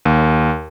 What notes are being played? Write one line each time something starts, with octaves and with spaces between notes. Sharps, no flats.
D#2